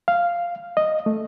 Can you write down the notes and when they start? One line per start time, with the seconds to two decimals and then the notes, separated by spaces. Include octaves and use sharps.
0.08 F5
0.77 D#5
1.06 A3